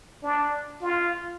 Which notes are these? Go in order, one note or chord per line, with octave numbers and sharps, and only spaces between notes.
D4
F4